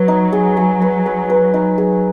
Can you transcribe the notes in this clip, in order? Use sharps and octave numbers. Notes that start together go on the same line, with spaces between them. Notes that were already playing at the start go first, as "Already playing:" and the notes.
Already playing: F#3 B4
D#4
G#4
G#4
B4
B4
B4
D#4
G#4